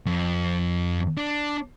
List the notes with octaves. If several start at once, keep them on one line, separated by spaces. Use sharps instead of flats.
F2
D4